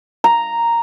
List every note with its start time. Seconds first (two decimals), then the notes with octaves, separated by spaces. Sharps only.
0.24 A#5